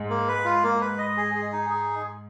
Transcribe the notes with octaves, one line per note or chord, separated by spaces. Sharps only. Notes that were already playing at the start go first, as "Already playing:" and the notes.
Already playing: G#2
A#3
B4
F4
A#3
B4
D#5
G#4
G#4
D#4
G#4